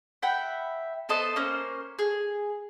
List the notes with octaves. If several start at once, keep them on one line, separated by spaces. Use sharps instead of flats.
E5 F#5 G5 B5
B3 A4 C5 D#5
A#3 C#4 C5
G#4